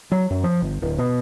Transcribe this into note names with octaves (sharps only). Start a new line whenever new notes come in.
F#3
F#2
F3
G1
D1
B2